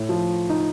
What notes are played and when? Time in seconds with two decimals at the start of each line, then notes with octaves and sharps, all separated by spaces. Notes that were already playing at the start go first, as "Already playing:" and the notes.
Already playing: A2
0.09 F3
0.49 D#4